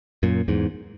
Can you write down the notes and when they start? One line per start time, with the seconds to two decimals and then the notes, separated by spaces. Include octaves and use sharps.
0.23 F#2 A#2
0.48 E2 G#2